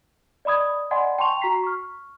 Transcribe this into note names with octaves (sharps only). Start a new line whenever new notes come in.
D5 D#5 B5 D#6 G#6
D5 D#5 F#5 G#5 B5 C6
G5 A5 C6 C#6 F7
F#4 A#5 C#6 B6 C7
C#6 F6